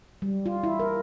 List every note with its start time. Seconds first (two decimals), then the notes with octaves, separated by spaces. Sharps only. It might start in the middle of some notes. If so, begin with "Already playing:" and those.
0.22 G3
0.46 F4
0.64 E4
0.80 A#4